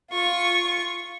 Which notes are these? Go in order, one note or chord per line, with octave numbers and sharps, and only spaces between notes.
F4 C#6